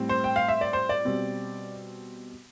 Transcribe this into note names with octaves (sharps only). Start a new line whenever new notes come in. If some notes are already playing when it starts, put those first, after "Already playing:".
Already playing: A2 G3 C4
C5
G5
F5
E5
D5
C5
D5
B2 G3 C4